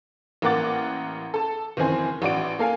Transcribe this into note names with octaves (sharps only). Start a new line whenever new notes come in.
A1 A#3 A#4 F#5 D6 A6
A4 A5
F#1 D#3 E3 C4 G#5
A1 F#4 D5 D7
A#3 A4 F5 G#5